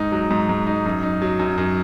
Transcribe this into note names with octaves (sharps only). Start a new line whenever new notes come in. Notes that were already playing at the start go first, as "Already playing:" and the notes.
Already playing: G#2 D#4
F#3
G#2
G#2
D#4
F#2
D#4
F#3
F#2
F#2